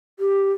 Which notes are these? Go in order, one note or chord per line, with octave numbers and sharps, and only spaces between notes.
G4